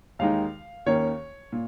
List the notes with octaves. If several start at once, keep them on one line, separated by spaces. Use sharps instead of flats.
D#2 D#3 G#3 D#4 F5
D#2 D#3 A#3 C#4 C#5
A#2